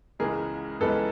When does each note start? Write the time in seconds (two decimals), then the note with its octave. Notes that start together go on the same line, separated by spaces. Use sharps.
0.19 C#2 C#3 E3 G#3 B3 G#4 A#4
0.80 C#2 C#3 E3 G#3 B3 A4 B4